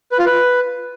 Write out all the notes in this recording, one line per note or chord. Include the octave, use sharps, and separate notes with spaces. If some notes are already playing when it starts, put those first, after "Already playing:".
B4
F4
B4